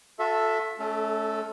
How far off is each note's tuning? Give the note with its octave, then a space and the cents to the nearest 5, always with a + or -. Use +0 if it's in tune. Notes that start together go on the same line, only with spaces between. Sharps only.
F#4 -45 A4 +0 E5 +5
A3 -30 C#4 +20 A4 +0